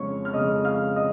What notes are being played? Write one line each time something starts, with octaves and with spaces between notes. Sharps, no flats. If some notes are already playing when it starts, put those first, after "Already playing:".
Already playing: F2 C#3 G#3 C#5 C#6
F6
F2 C#3 G#3 D#5 D#6
F5 F6
D#5 D#6